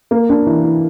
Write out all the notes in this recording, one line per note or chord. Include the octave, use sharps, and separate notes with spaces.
A#3
D4
E3
E3